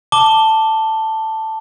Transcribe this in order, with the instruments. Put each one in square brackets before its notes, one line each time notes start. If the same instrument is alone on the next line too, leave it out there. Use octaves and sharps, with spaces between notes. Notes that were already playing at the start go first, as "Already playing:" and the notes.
[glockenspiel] A5 D6 G7